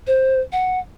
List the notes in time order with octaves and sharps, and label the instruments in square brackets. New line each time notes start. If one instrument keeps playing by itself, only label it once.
[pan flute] C5
F#5